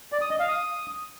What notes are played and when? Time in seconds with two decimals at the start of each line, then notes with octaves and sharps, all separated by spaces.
0.12 D5
0.21 D#6
0.30 D#5
0.39 F5
0.48 D#6